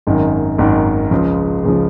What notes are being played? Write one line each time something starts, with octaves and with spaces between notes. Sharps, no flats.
G#1 F#2 D#3
G#1 F#2 D#3
C#2 C#3 F3
C#2 C#3 F3